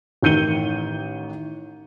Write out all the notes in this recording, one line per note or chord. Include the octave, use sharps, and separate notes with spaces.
A1 D#3 G6 C#7 D#7 G7